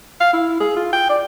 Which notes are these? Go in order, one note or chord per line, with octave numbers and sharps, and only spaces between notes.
F5
E4
G#4
F4
G5
D5